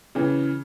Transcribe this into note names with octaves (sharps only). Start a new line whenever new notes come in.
C#3 E3